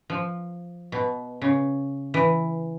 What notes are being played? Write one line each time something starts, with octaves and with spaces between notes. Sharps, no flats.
F3
B2
C#3
E3